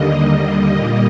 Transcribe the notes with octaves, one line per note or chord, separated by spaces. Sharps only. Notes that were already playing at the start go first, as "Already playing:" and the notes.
Already playing: D#2 D3 G3 A#3 D#5
D#5
A#2 G3 A#3